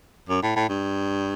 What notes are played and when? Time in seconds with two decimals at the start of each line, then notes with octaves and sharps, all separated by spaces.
0.29 F#2
0.42 A2
0.56 A2
0.69 G2